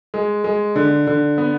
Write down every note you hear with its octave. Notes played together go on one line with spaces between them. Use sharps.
G#3
G#3
D3
D3
B3